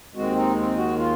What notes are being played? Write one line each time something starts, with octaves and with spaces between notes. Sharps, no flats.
D#2 D#3 G#3 C4 F#4
D#4
C4
F#4
F4